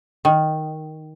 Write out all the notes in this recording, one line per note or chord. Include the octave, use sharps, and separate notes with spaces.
D#3